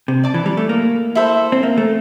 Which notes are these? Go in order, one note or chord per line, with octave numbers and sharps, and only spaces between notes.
C3
D5 A5 D6
E3
G3
A3
A#3
E4 A4 C5
C4
A#3
A3